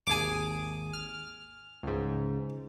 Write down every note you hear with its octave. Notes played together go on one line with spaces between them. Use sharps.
G#1 D#2 G#4 G#5 D6
F6
C#2 G#2